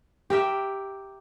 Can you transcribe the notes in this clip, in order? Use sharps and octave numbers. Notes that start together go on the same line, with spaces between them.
G4 A#4 E5 G5